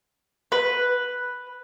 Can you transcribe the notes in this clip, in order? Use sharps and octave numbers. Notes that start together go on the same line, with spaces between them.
B4